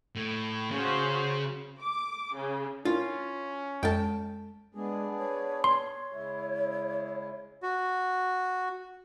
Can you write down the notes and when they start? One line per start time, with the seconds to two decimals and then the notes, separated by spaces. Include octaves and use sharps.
0.16 A2
0.71 C#3 C#4 F#4 C5
1.80 D6
2.36 C#3
2.85 C#4 D4 E4 F4 A#4
3.83 F2 G#3 A4 G5 A5
4.75 G#3 B3 D4 G#4
5.18 C#5
5.64 C#5 C6
6.12 C#3 G#3 E4
7.63 F#4